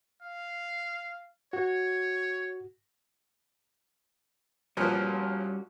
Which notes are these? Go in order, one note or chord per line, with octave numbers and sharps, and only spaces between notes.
F5
F#4 C#5
A#2 F3 G3 B3 C#4 F#4